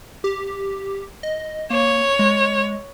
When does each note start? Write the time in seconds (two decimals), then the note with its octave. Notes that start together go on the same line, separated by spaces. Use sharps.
0.24 G4
1.23 D#5
1.70 A#3 C#5
2.19 G#3